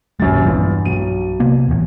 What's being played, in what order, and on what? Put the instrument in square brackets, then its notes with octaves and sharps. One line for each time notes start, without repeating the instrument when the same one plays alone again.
[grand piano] D#1 F#2 A6 [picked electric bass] A#1 F#3 G#3
[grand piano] E1 E2 F4 [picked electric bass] G2
[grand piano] B1 F#3 D#7
[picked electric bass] C3 A#3 B3
D#1 A1 E2